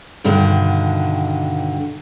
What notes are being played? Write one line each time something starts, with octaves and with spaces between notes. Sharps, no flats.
G2 B2 D3 D#3